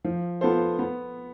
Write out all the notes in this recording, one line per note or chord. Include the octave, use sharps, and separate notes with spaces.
F3
B3 F4 A4 C5
B3